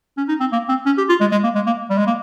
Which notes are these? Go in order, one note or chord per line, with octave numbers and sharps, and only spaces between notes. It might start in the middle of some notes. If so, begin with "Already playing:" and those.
C#4
D#4
C4
A#3
C4
C#4
G4
F4
G#3
G#3
A#3
G#3
A#3
G3
G#3
A#3